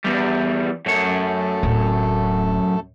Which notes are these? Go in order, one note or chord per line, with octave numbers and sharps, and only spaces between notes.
E2 G3
F#2 A3 A4 C#5
D1